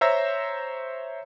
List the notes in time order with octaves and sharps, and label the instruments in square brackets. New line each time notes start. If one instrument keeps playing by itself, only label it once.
[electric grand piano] C5 C#5 E5 A#5 E6 A#6